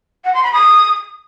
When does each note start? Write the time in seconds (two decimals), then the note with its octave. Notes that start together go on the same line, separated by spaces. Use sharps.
0.24 F#5
0.34 C6
0.44 B5
0.53 D#6